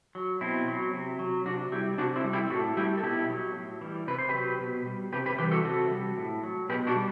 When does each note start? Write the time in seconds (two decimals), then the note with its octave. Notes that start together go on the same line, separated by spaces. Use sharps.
0.15 F#3
0.41 B2 C4 E4
0.68 F#3
0.94 C3
1.19 F#3
1.46 C3 D4 F#4
1.72 G3 E4 G4
1.98 C3 D4 F#4
2.16 C4 E4
2.24 G3
2.33 E4 G4
2.50 A2 F#4 A4
2.77 G3 E4 G4
2.97 A4
3.03 B2 E4 G4
3.29 F#3
3.55 A2
3.81 E3 G3
4.08 C3 B4
4.18 C5
4.29 F#3 G4 B4
4.60 B2
4.86 G3
5.13 C3 G4 B4
5.26 G4 B4
5.38 E3 G3 G4 B4
5.51 F#4 A4
5.65 C3 F#4 A4
5.91 G3
6.18 A2
6.44 F#3
6.69 B2 G4 B4
6.87 D4 F#4
6.96 G3